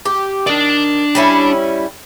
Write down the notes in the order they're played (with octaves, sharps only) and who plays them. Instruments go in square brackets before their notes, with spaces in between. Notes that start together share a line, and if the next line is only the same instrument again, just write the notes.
[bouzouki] G4
[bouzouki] D#3 [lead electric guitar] D4 D5
[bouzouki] G3 C#4 E4